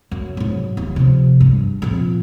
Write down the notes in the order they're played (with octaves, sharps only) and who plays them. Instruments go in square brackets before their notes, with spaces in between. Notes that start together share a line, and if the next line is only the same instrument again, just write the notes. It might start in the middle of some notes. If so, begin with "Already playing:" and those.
[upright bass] F#2
G#2 F#3
D#1 D#2
C3 F3
G2
F2 A#2